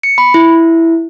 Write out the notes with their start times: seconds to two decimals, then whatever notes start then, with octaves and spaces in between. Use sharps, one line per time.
0.03 C#7
0.18 B5
0.34 E4